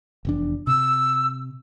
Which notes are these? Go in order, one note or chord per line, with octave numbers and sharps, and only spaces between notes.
F1 E2 D4
C3 E6